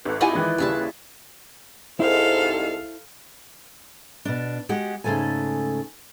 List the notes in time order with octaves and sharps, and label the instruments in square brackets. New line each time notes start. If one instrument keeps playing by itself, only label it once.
[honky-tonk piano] G#1 A4 [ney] B4
[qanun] E4 D5 D#5 [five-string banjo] F4 F#5 G#5 [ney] G4
[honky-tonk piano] D#3 E3 G#3 [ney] B4
[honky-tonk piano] D#2 C#3 G3 [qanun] G#4 E5 A5
[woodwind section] C2 G#2 [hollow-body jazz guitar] E4 C5 [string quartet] A4 F5
[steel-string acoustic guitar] B2 D4
G#3 F#4 G4 F#5
G#2 C#3 E3 A3 A4 G#5